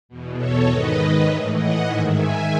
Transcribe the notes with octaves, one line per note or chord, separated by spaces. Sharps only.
E2 B2
A4 C#5
G#2 D#3 B4 D#5
A2 E3 C#5 E5
D#5 F#5
G#2 D#3 E5 G#5
E5 G#5